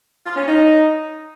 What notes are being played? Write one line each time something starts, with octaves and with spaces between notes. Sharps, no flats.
F4
C#4
D#4